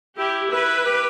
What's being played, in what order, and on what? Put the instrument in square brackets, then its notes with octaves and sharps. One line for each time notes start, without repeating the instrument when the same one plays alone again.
[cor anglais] E4 [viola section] G4
[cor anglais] E4 [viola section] B4
[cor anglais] G4